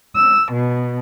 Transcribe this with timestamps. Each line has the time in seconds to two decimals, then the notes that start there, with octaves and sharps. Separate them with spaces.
0.16 E6
0.52 B2